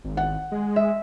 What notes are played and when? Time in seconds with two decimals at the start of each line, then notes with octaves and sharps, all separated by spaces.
0.04 G#1
0.17 F#5
0.52 G#3
0.76 E5